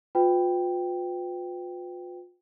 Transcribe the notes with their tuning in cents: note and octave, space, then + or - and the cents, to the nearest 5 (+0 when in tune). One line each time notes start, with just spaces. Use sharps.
F4 +35 B4 +30 G5 +0